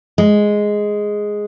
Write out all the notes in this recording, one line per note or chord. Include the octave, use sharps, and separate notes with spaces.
G#3